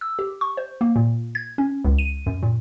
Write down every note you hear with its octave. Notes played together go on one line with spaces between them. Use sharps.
E6
G4
C#6
C5
A#3
A#2
G#6
C#4
C#2
D#7
F#2
A#2